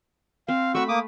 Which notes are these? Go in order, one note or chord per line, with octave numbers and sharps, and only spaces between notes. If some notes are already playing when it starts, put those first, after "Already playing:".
C4 F5
A3 F#4 B5 C#6 E6
A#3 D6 D#6